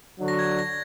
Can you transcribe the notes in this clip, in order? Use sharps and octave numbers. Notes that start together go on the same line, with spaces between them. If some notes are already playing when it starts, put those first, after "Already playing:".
D3 F#3 D4 F#4
A#6
G#6
A#6